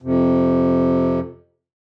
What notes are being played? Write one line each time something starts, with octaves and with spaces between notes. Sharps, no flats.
F2 C3